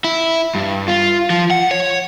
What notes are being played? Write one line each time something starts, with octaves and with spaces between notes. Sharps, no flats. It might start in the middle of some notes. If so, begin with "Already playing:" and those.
E4
G2
F4
F3
F#5
C#5